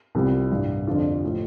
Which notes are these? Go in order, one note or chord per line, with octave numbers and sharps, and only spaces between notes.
C2 C3 G3 F4
A1 G2 G3
F2 D3 F3 D4 F4
A2 F3